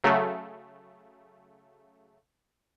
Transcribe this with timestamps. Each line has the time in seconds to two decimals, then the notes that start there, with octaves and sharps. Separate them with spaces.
0.04 C#3 F#3 A3